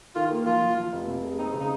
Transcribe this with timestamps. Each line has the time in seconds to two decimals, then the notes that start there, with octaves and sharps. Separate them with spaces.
0.15 D#3 F4
0.31 A#3
0.46 F3 F4
0.62 F3
0.77 F3
0.92 F1
1.07 C3
1.23 G#3
1.38 C4 D#4
1.54 C#3
1.60 D#4